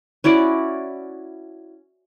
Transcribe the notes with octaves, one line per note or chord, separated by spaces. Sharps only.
C#4 E4 F#4 D5